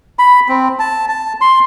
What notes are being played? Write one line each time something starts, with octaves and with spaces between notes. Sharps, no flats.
B5
C4
A5
A5
C6